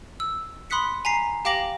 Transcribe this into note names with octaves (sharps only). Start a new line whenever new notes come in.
E6
B5 C6 D#6 F#6 B6 C#7
G#5 A#5 B6 C7
G4 F5 G5 D6 A#6 F#7